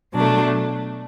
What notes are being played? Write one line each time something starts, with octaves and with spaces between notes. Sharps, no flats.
B2 F#3 A3 D4